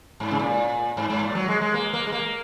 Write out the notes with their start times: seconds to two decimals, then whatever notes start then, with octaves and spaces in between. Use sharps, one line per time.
0.20 G#2
0.31 C#3
0.39 A#2
0.97 G#2
1.10 G#2
1.23 A#2
1.35 F#3
1.48 G#3
1.61 G#3
1.74 A#3
1.93 A#3
2.07 G#3
2.12 A#3